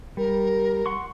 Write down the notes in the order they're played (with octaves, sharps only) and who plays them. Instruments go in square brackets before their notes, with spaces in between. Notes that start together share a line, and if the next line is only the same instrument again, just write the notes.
[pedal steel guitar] G3 [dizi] A#4
[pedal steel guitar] F#5 C6 C#6